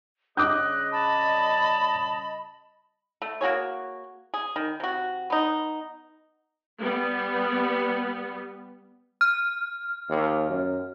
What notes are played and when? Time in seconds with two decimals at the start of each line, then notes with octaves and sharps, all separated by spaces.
0.37 C#3 G3 D#5 D6 D#6 F#6 G6
0.92 A5 B5
3.22 A3
3.41 A#3 F#4 G#4 C#5
4.34 G#4
4.56 D#3
4.80 C3 F#4
5.30 B3 D#4
6.80 G3 B3
9.21 F6
10.09 D#2
10.49 F#2